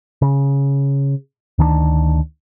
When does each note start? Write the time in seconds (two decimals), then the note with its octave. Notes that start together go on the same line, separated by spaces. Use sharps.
0.22 C#3
1.58 D2 D#3 F#3 D4